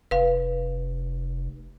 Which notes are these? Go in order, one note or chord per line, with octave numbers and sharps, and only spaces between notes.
F1 B4 F5